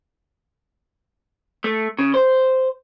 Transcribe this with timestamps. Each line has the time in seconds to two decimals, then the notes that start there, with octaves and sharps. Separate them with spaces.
1.64 A3
1.99 C#3
2.14 C5